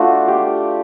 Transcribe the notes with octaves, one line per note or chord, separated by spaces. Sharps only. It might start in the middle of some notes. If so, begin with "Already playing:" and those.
Already playing: A3 D4 F4 F#4
G4